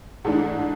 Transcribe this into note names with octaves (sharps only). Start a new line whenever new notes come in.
G#2 E3 A3 D4